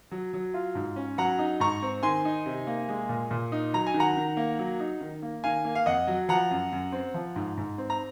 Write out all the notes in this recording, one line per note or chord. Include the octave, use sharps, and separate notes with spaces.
F#3
F#3
F4
G#2
C#4
F#3 F#5 A#5
D#4
G#2 A#5 C#6
C4
D#3 G#5 C6
D#4
C3
A#3
G#3
A#2
A#2
D#4
F#3 A#5
G#5
D#3
F#5 A#5
D#3
A#3
F#3
D#4
D#3
A#3
D#3 F5 G#5
A#3
F5
F2 D#5 F#5
F#3
F3 F#5 A#5
F#2
F#2
C4
F3
G#2
G#2
C4
A#5